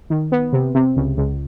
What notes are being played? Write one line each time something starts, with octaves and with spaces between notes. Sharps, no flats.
D#3
B3
C3
C3
C#2
C#2